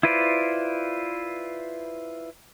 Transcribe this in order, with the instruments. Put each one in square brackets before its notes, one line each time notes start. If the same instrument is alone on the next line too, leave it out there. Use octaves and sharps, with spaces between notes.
[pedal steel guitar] E4 F4 B4 C5 D5